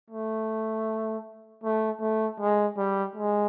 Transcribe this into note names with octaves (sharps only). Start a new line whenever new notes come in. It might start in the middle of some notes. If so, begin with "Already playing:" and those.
A3
A3
A3
G#3
G3
G#3